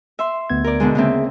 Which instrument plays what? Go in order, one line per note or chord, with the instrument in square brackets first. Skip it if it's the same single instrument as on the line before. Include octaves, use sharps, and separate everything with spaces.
[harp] E5 C6
[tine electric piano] D2 B3 G#6
[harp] A#4 D5
B2 D3 G#3
[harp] C#3 A#3 C4 [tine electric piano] G#4 E5